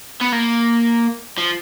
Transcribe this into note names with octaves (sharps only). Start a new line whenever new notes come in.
B3
A#3
F3